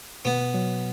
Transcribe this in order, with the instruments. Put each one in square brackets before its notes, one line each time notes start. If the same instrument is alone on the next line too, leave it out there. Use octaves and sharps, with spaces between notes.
[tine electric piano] B2 [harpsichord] B3
[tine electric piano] F#3